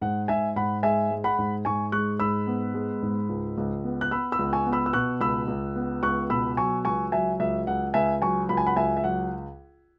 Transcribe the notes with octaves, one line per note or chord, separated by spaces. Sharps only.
G#2 F#5
G#2 E5 G#5
G#2 F#5 B5
G#3 E5 G#5
G#3
F#5 B5
G#2
G#2 G#5 C#6
G#3 C#6 F#6
G#2 B5 E6
B3
G#3
G#2
C#2
C#2
B3
F#6
B3 B5 E6
B5 E6
C#2
G#5 C#6
B3
B5 E6
E6
B2 C#6 F#6
C#2 B5 E6
C#2
B3
C#2 C#6 F#6
B2 B5 E6
F#3 G#5 C#6
C#2 G#5 C#6
F#3 E5 G#5
C#2 E5
C#2 F#5
C#2 E5 G#5
F#3 G#5 C#6
C#2 B5
G#5
F#5 B5
C#2 E5 G#5
E5
F#3 F#5